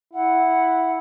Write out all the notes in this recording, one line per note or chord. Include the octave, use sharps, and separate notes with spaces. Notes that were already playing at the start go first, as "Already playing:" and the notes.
E4 F#5